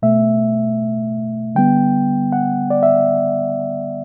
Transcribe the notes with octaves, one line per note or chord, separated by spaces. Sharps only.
B2 A3 E5
D3 G3 B3 G5
F#5
D5
E5